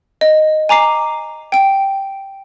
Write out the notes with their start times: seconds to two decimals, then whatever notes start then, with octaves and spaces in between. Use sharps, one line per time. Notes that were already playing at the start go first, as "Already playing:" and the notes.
0.21 D#5
0.69 G#5 A#5 D6 C7
1.52 G5 D7